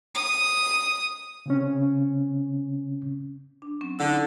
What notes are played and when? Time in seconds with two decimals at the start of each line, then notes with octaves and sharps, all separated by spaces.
0.15 D#6
1.46 C#3 C4 C#4
3.62 D4
3.81 F#3 C4 C#4
3.99 D3 D#4 E4